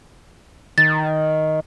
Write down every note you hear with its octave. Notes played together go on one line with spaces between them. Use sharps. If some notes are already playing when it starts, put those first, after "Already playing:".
D#3 A6